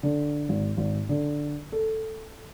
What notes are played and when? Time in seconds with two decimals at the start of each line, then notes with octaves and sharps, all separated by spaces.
0.03 D3
0.49 G#1
0.77 G#1
1.09 D3
1.72 A4